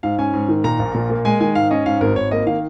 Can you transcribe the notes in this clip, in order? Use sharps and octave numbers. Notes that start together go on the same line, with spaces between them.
G#2 F5
C#4 G#5
G#2
D#3
A#2 A#5
A#1
A#2
A#3
G#3 G#5
D#3 G#5
G#2 F5
C#4 D#5
G#2 F5
G#1 A#4
G#1 C#5
A#3 D#5
D#3 F5